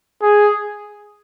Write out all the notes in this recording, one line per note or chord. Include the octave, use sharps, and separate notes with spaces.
G#4